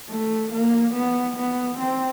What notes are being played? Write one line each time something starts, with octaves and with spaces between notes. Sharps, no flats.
A3
A#3
B3
B3
C4